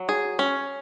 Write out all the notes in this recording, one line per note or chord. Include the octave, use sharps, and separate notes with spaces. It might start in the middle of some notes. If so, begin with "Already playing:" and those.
Already playing: F#3
G#4
C#4